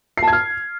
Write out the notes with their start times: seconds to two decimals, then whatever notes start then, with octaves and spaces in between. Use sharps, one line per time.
0.18 C7
0.23 A5
0.28 G#6
0.33 F6